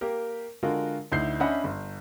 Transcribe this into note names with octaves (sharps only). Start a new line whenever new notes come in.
A#3 G4 A#4
D3 G#3 F4 F#4 A#4
D2 D#4 E4 G6 C7
C#4 D4 D#5 E5 F#5 B5
G1